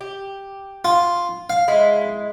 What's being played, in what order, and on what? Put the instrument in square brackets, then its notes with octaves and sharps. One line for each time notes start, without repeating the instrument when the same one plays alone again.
[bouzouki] G4
[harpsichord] F4
F5
[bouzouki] G#3 E4